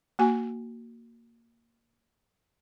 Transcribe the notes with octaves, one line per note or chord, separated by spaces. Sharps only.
A#3 F#4 G#5